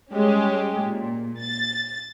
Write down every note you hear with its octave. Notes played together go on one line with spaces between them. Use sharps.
G3 G#3 C#4 G4
A#2
A6